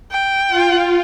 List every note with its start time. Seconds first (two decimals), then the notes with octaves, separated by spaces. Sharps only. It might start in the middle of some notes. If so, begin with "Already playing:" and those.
0.12 G5
0.49 F4